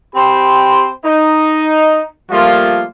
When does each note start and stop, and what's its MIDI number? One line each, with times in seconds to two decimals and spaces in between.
0.15 0.89 60
0.15 0.89 67
0.15 0.89 72
0.15 0.89 79
0.15 0.89 83
0.15 0.89 84
1.05 2.05 63
2.31 2.84 53
2.31 2.84 55
2.31 2.84 57
2.31 2.84 58
2.31 2.84 65